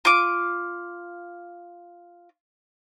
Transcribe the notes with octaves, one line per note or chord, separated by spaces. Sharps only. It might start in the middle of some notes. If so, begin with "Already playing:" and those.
F4 D6